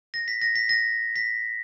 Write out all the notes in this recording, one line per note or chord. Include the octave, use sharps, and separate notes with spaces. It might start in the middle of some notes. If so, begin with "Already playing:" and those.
A#6
B6
A#6
B6
A#6
B6